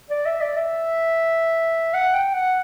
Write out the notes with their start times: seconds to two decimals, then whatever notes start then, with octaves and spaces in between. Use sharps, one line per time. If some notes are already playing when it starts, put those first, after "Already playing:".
0.10 D5
0.26 E5
0.41 D5
0.57 E5
1.94 F#5
2.14 G5
2.34 F#5